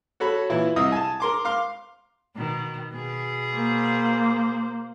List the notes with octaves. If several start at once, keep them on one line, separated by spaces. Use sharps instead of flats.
F#4 A4 C#5 B5
A#2 E3 E4
C2 D#5 E5 D#6
G#5 A5
A#4 C6 D6
F5 C6 D6
B2 D#3
B2 G#4
A#3 C5